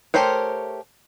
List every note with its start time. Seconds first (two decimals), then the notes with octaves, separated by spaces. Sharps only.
0.14 A3 G4 A#4 C5 C#5